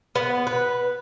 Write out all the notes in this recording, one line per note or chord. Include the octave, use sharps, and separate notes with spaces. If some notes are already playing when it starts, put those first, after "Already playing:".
B3
B4